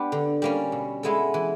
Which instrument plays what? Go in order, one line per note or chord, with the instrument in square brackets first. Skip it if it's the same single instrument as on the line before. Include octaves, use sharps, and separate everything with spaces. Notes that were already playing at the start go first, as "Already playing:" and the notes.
Already playing: [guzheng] B3 D4 G4
D3
G3 A#3 C#4
B2
G#3 B3 E4 A4
E3